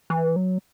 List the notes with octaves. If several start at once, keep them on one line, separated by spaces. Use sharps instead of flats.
E3
F#3